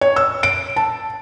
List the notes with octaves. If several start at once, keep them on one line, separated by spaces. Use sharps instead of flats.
C#5
E6
D7
A5